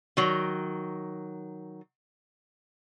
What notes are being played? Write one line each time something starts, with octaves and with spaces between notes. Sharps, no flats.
D#3 F#3